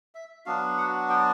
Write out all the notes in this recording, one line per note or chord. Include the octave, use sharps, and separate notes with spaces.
E5
F#3 B3 D4 F#4 F5
F#5
G5